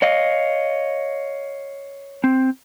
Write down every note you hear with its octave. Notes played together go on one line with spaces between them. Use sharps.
C#5 D#5 F5
C4